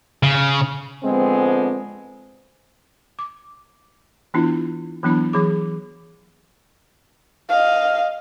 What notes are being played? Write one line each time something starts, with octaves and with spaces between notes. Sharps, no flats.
C#3
D3 F3 G#3 B3 C4
D6
E3 B3 D4 E4 F4
E3 F#3 B3 D4 E4 B5
E3 F#3 G#4 D6
D#5 F5